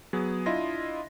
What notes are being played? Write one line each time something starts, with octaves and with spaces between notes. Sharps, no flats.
F#3 B3 G#4
D4 E4 F4 D#5 C6 A#6